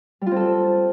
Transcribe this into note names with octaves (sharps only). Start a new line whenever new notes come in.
G3 C4 F4 A4